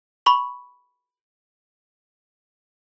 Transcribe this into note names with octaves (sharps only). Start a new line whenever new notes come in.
B5 C#6 F#7